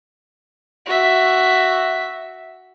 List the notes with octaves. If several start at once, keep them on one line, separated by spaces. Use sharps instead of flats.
F#4 E5